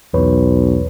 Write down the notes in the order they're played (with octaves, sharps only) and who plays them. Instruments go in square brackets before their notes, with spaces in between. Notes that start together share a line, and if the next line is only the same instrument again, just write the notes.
[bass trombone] B1 [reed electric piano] E2 B4 C#5